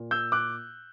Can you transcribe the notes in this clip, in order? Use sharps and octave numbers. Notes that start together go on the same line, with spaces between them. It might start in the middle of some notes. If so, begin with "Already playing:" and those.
Already playing: A#2
E6 G6
D6 F#6